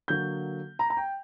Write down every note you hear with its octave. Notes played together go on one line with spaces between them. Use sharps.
D3 F#3 A#3 G6
A#5
A#5
G5